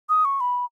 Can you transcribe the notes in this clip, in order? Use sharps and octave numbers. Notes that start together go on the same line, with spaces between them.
D#6
C#6
B5